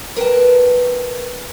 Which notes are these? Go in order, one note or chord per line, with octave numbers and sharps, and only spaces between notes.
A#4 B4 F5 G5 A5